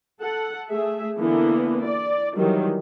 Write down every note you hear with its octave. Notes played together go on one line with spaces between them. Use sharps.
A4 F#5
A3 G#4 E5
D3 E3 A#3 B3
D5
D#3 E3 F#3 G3